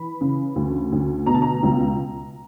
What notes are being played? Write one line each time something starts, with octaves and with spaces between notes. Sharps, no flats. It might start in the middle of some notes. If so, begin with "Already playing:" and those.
Already playing: E3 B5
C#3
D2
D2
B2 A#5
A5
A#5
C#2